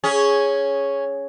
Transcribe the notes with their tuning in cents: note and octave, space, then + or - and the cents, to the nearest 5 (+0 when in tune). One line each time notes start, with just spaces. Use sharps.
C#4 +0 G#4 +0